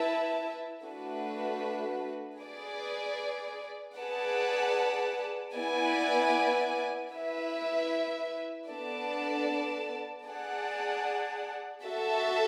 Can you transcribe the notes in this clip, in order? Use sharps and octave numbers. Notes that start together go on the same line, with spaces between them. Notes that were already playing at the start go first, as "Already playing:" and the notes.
Already playing: E4 B4 E5 A5
A3 D4 F#4 B4
G#4 B4 D5
G#4 B4 D5 F#5 A5
B3 E4 B4 D5 G#5
E4 B4 E5
B3 D4 A4 D5 A5
G#4 D5 F#5 A5
F#4 A4 E5 A5